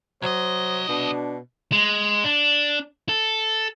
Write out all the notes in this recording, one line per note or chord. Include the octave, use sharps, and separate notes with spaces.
C2 F#3 C5 D#5
B2 D4
G#3
D4
A4